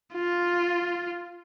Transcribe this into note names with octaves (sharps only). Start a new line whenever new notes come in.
F4